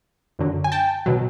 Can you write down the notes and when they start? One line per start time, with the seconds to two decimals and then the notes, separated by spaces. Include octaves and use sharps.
0.39 F#2 D3 F#3
0.64 G#5
0.72 G5 A5
1.06 B2 F#3